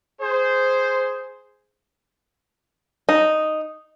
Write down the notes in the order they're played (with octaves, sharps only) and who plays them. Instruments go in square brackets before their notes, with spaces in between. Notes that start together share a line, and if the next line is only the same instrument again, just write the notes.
[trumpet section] G#4 C5
[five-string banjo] D#4